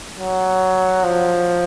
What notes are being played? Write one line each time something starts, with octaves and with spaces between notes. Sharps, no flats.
F#3
F3